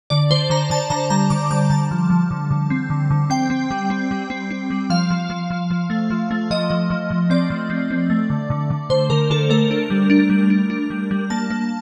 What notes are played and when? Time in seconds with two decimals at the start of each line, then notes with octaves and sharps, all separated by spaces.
0.10 D3 D5
0.30 D3 C5
0.50 D3 A#5
0.70 D3 A5
0.90 D3 A#5
1.10 G3 A#5
1.30 D3 D6
1.51 G3 D6
1.70 D3 A5
1.91 F3
2.10 F3
2.31 D3
2.51 D3
2.70 C4
2.90 D3
3.11 D3
3.30 C4 G5
3.50 C4
3.71 G3
3.90 C4
4.11 G3
4.30 C4
4.51 C4
4.70 G3
4.90 F3 F5
5.10 F3
5.30 F3
5.50 F3
5.71 F3
5.90 A3
6.10 F3
6.31 A3
6.51 F3 D#5
6.70 F3
6.90 F3
7.11 F3
7.30 C4 D5
7.50 F3
7.70 C4
7.90 C4
8.10 A3
8.30 D3
8.50 D3
8.70 D3
8.90 D3 C5
9.10 D3 A#4
9.30 D3 A4
9.50 A3 A#4
9.71 D4
9.90 G3
10.10 D4
10.30 G3
10.50 D4
10.70 D4
10.90 G3
11.11 G3
11.30 A#3 A5
11.50 A#3